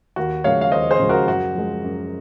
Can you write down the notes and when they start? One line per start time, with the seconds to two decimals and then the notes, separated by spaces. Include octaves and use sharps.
0.16 D#2 F#4
0.44 C#3 F3 G#3 C#5 F5
0.61 F5
0.72 D#2 C5 D#5
0.91 G#4 C5
0.99 C#3 F3 G#3
1.09 F#4 A#4
1.27 F#2 F#4
1.55 F3 G#3
1.83 F#2